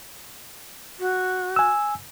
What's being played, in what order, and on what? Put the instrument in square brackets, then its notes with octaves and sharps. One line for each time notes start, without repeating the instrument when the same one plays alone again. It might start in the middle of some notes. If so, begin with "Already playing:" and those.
[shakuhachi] F#4
[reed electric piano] G#5 E6